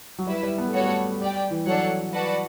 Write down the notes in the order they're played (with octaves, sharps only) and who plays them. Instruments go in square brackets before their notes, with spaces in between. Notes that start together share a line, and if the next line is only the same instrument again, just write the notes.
[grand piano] F#3
[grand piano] G3 [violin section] E4 B4 E5
[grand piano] G3
B3
A3
[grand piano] G3 [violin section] F#4 A4 C#5 F#5
[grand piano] A3
[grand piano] G3 [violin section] G4 D5 G5
[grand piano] E3
[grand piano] F#3 [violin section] D4 A4 C#5 F#5
[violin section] F#4 B4 D5 F#5 A5